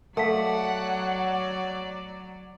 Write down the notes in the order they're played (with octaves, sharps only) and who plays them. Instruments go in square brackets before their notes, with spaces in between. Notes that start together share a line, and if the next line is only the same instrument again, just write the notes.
[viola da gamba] F#3 D5 [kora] A3 [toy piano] A4 F5 [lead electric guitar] F#5